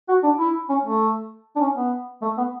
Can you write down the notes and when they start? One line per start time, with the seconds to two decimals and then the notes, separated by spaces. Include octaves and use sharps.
0.09 F#4
0.23 D4
0.39 E4
0.69 C#4
0.85 A3
1.56 D4
1.61 C#4
1.76 B3
2.22 A3
2.38 B3